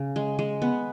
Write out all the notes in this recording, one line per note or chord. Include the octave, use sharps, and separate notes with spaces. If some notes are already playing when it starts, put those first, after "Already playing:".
Already playing: C#3
G#3
G#3
B3